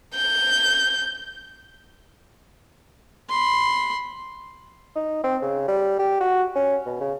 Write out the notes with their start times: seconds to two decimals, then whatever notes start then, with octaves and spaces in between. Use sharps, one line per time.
0.15 G6
3.29 B5 C6
4.96 D#4
5.24 C4
5.42 C#3
5.68 G3
5.99 G4
6.21 F#4
6.55 C#4
6.86 B2
7.01 C#3